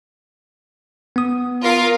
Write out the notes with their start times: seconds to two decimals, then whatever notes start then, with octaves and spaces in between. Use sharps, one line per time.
1.16 B3 D#6
1.62 F4 A#4 F5